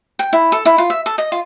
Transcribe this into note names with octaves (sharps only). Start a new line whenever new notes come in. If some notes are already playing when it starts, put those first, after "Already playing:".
G5
E4
A4
E4
F4
E5
A4
D#5
F4